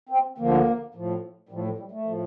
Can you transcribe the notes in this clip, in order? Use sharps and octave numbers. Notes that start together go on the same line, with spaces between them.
C4
D2 D3 F3 A#3
A2 F3
A2 F3 G3
F3
G3
A3
A2 F3